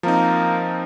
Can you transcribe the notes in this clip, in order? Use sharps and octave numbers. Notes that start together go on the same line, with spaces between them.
F3 A#3 C4 D#4